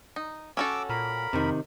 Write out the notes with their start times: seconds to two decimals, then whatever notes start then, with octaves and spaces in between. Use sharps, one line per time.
0.16 D#4
0.57 C#4 F#4 A4 D6 E6
0.89 A#2 A#4 B5
1.33 F2 C3 D#3